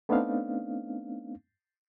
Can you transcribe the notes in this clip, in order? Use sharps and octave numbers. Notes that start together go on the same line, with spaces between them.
A3 B3 C4 D4 D#4 F5